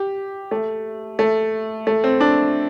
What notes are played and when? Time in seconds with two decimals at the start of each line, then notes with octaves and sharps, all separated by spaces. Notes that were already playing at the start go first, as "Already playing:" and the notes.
Already playing: G4
0.51 A3
1.19 A3
1.87 A3
2.04 C4
2.20 D4